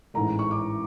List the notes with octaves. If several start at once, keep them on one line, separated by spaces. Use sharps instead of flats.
A1 G#2 E3 A3 A#5
C#6
D6